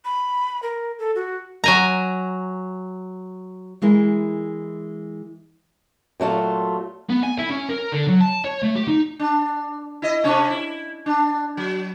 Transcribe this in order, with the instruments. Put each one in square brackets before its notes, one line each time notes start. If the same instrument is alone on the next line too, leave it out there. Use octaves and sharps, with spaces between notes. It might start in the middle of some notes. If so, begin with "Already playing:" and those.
[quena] B5
A#4
A4
F#4
[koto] F#3 G#5 A#5
[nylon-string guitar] E3 G#3 E4 A#4
[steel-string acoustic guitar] A#2 F#3 A3 F4
[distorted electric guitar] B3
G#5
E4
C#4
A#4
D3
F#3
A5
C#5
A3
G4
D#4
[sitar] D4
E4 D#5
C3 C#4 D4
E4
D4
F#3